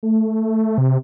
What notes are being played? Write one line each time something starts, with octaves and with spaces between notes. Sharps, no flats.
A3
C3